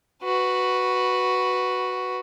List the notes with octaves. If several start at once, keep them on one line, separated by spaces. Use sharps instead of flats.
F#4 B4